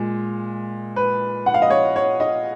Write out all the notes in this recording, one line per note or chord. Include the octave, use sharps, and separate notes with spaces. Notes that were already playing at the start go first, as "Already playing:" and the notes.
Already playing: A#2 G#3
B4
F#5
F5
D#5
C#5
C#5
D#5